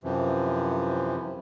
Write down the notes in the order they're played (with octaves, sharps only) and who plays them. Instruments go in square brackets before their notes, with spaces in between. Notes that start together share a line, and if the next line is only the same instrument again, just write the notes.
[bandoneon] F#2 C3 E3 F3